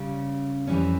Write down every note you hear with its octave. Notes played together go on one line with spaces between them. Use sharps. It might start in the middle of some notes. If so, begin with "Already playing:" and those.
Already playing: C#3 G3 C#4
F2 E3 G3 C#4